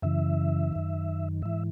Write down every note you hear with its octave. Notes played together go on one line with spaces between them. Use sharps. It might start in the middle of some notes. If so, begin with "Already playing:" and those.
F#2 C#3 E3 E5
F#2 D#3
G#2 E3 E5